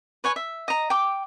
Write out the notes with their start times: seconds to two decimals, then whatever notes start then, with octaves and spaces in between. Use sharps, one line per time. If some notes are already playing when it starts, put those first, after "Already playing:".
0.24 B4 C#5 G#5
0.36 E5
0.68 D#5 A#5
0.90 G5 D6